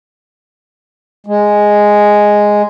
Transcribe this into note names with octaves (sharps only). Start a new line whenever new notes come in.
G#3